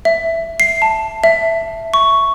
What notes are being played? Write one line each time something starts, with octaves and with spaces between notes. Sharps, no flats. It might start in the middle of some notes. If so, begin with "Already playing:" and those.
E5
C7
A5
E5
C#6